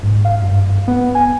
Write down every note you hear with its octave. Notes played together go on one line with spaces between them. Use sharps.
G#2
F5
G2
B3
G#5